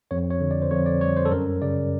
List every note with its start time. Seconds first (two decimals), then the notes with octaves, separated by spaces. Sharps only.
0.11 F2 C#5
0.30 C#5
0.41 D3
0.51 D5
0.62 C5
0.71 F2 C#5
0.86 D5
1.01 G3 C#5
1.17 C5
1.25 A4
1.32 F#2 A#4
1.62 C#3 D5